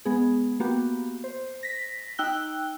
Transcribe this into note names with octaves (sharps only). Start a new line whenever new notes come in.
G#3 B3 G#4
A#3 B3 F#4 G4
C5
A#6 B6
D#4 G5 E6 F#6 G7